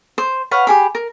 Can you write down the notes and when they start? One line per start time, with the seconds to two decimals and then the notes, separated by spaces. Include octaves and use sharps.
0.18 C5
0.51 B4 C#5 F5 F#5
0.67 G4 G#4 B5
0.95 A#4